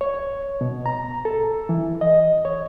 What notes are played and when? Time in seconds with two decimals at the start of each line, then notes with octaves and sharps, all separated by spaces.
0.01 C#5
0.61 B2
0.86 A#5
1.25 A4
1.69 E3
2.01 D#5
2.45 C#5